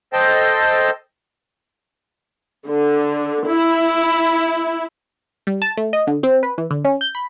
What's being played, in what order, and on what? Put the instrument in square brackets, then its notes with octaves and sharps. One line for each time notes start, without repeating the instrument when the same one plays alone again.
[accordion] A4 C5 D#5 G5 A5
[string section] D3
E4
[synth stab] G3
A5
A3
D#5
D3
C4
B4
E3
D3
C#4
G6
B5